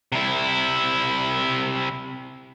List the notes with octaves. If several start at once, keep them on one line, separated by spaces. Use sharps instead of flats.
C3 E4